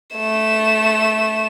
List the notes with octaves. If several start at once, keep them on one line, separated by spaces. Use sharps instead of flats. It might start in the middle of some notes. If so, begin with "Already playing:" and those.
A3 E7